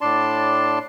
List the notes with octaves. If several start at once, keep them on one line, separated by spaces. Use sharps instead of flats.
A2 D4 D5 A5 C6